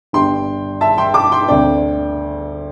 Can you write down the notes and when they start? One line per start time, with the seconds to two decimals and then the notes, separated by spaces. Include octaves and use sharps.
0.13 G1 G2 G3 D4 G5 C6
0.81 E5 A5
0.98 G5 C6
1.14 A5 D6
1.32 G5 C6
1.48 D2 D3 C4 D5 G5